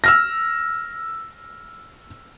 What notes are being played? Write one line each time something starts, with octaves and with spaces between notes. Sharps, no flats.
E6 F6 A#6